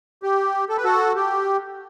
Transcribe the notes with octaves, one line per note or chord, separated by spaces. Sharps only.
G4
A4
B4
F#4 A4
G4